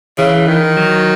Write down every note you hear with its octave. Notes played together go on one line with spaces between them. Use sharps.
C#3 E3
D#3
F#3